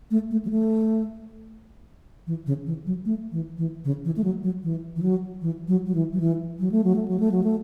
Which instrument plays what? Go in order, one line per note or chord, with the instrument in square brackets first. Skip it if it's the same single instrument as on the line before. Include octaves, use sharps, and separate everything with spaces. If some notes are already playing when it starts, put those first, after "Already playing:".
[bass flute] A3
A3
F#3
A3
E3
C#3
E3
F#3
A3
E3
E3
C#3
E3
A3
F#3
F#3
E3
E3
F#3
E3
F#3
F#3
E3
F#3
E3
F#3
A3
F#3
A3
F#3
A3
F#3
A3